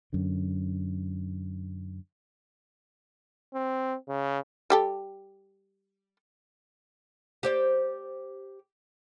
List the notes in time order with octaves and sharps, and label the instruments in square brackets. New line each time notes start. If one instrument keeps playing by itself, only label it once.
[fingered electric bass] F#2 D3
[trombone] C4
C#3
[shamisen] G3 G4 A4
[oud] G4 C5 D5